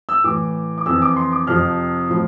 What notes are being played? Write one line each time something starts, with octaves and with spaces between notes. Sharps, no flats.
E6
A2 E3 D6
D6
F2 E3 E6
D6
C6
D6
F2 C3 F3 F6
A2 F3